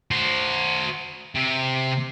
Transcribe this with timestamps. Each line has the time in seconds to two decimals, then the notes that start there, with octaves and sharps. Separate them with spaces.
0.11 F#4 C5
1.35 C3